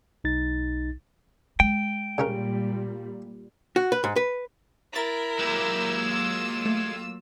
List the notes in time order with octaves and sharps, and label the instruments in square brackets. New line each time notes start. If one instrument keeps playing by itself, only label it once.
[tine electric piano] B1 D#4 A6
[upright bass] G#3 [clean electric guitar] G5
[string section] A#2 G3 [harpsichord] C#3 C#4 A#4
[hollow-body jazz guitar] F#4
B4
G#2
B4
[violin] E4 A#4 [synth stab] A#5 A6
[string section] F#3 A#3 E6 [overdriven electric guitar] G#3 G4
[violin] F4
[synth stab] A3